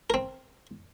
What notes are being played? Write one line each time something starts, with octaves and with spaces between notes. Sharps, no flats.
C4 A#4